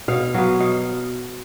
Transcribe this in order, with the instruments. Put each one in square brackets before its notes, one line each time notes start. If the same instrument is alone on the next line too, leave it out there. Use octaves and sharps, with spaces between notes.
[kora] B2 F5
F#3 B3 F5
B2 F5